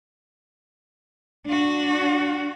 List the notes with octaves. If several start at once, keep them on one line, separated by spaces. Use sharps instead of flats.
D4 F#4